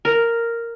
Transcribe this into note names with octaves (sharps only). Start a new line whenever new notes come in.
A#4